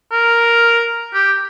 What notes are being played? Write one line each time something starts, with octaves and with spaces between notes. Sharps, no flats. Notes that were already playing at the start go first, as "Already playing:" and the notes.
A#4
G4